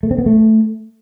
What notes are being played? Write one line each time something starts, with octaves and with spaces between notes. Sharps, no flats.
A3
C4
B3
A3